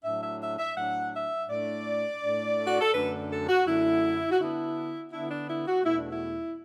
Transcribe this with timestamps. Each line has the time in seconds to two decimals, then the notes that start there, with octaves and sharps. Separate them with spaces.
0.04 A2 F#3 D4 E5
0.22 E5
0.40 E5
0.59 E5
0.76 A2 F#3 D4 F#5
1.13 E5
1.49 A2 A3 D4 D5
2.21 A2 A3 D4
2.67 F#4
2.80 A4
2.94 F#2 D3 A3 D4 B4
3.31 A4
3.48 F#4
3.66 F#2 D3 A3 D4 E4
4.31 F#4
4.39 D3 B3 D4 E4
5.11 D3 B3 D4 E4
5.29 D4
5.48 E4
5.66 F#4
5.84 E2 B2 A3 E4
5.98 D4
6.12 E4